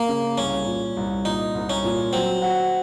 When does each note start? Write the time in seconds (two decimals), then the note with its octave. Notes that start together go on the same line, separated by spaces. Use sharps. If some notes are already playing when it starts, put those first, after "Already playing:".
Already playing: A#3
0.09 C#3
0.38 C2 C#4
0.66 A#2
0.97 C2
1.25 A#2 D#4
1.55 C2
1.70 C#4
1.84 A#2
2.13 F#3 C4
2.42 F#4